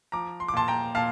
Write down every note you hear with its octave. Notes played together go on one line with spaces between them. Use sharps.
F3 A#5 D6
C6
D6
A#2 A5 C6
G5 A#5
A#2 F5 A5